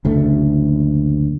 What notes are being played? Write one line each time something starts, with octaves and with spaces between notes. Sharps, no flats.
F#1 D2 A3